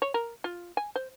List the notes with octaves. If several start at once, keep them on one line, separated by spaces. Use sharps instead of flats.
C#5
A#4
F4
G#5
C5